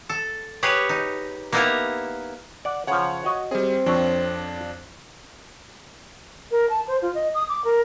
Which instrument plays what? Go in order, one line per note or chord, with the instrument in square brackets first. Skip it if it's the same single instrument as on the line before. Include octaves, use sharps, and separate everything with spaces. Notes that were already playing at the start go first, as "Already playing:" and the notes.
[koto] A4
G4 G#4 B4 C#5
D#4
A#3 B3 D#4 E4 G4 A#4
[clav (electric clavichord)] D5 F#5
[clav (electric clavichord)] C#3 F3 [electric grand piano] C#5 F#5
[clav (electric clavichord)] F#4 D#5
[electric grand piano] G3 G#4 [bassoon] C4
[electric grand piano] F2 F3 D4 [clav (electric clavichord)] A4 C#5 G5
[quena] A#4
A5
C5
F4
D#5
D#6
D6
A#4